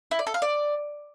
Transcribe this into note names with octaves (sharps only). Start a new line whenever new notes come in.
E4
D5
A4
F5
D5